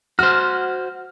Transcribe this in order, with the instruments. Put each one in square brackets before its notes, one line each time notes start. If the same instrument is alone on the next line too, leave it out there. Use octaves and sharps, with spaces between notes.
[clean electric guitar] F#4 C5 [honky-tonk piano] F6